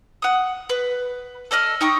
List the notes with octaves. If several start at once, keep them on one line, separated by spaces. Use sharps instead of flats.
F#5 D#6
B4
A4 D5 D#5 F6
D#4 G5 C#6 D#6